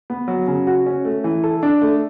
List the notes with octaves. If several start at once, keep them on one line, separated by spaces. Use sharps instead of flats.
B3
F#3
C#3
F#4
C#4
A3
E3
A4
D4
A3